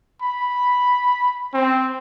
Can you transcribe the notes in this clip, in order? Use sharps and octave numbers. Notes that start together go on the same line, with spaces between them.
B5
C4